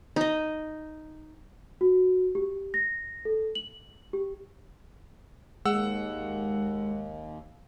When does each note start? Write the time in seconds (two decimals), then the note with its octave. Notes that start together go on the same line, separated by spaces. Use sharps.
0.16 D#4 D#5
1.81 F#4
2.35 G4
2.74 A#6
3.25 A4
3.55 F#7
4.13 G4
5.65 D#2 G#3 F#5 E6